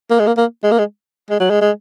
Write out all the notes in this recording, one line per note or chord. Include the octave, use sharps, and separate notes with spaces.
A#3
G#3
A#3
A#3
G#3
A#3
G#3
G#3
F#3
G#3
G#3